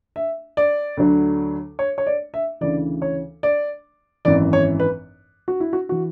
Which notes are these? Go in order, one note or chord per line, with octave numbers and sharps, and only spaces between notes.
E5
D5
D2 D3 F#3
C#5
C#5
D5
E5
D2 C#3 E3 D5
C#5
D5
G#1 F#2 E3 D5
C#5
B4
F#4
E4
F#4
E3 F#4